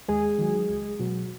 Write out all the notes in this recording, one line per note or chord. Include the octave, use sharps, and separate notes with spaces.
D#2 G#3 G#4
D#3 F#3
C#2
B2 F#3